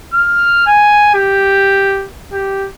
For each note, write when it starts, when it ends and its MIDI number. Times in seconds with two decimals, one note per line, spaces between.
0.14 0.63 89
0.67 1.10 80
1.14 2.07 67
2.32 2.68 67